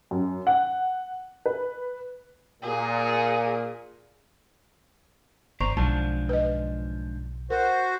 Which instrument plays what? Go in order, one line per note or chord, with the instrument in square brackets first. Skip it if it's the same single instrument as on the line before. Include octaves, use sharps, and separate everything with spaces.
[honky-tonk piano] F#2
F#5
B4
[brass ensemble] A#2 [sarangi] G#4
[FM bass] G1 [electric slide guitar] C5 D5 A#5 [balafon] C#6
[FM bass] B1 [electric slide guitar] G#2 F3 D4 [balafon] A5
[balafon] B4 D#5
[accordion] F#4 C5 [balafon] A#4